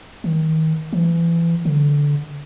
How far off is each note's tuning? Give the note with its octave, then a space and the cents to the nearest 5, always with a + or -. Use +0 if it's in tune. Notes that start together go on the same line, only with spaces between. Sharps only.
D#3 +30
E3 +30
D3 -15